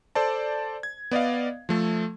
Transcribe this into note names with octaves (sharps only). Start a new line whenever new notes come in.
A4 C5 D5 A5
G#6
B3 D5 D#5 F5
F3 A3 A4